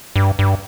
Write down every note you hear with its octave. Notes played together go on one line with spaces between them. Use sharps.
G2
G2